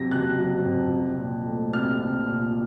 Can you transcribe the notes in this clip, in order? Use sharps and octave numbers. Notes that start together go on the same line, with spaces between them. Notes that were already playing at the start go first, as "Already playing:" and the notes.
Already playing: F2 C3 F#3 A#6
F#1 F#6
F#3
F2
C2
A#2
A3
C2 F6
C2
A#2